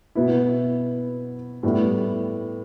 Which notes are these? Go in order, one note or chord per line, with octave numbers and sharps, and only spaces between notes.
B2 B3 E4
A2 G3 B3 E4